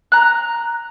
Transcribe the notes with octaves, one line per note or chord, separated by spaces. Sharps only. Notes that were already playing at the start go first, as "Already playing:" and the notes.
A#5 F#6